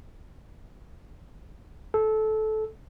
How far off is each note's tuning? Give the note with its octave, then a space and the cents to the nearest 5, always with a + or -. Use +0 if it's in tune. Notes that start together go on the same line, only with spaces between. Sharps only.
A4 -20